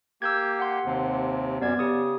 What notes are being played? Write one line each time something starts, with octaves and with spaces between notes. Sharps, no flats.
A#3 G4 E6 G6 G#6
F#5 C6
D#2 C3
F#2 B3 D5 G#6
C#3 G4 D#6